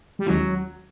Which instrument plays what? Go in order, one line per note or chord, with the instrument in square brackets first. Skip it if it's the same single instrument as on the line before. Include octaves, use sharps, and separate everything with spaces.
[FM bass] G3
[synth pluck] D#2 D#3 G#3 C#4 E4 [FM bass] F#3